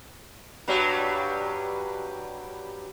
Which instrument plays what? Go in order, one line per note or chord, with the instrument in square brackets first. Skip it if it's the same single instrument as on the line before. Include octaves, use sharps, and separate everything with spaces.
[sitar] G2 F#3 G3